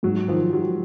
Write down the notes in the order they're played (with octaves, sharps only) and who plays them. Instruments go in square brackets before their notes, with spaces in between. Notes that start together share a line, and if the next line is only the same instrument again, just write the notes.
[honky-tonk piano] G#2 [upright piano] F#3
[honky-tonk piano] D#3 [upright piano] F3
[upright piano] F#3 [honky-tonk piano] G3